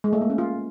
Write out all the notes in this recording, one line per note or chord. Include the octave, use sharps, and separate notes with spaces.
G#3
A3
A#3
C#4
F4